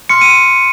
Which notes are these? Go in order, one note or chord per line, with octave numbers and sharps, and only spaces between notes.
C6 F6 C#7
D#7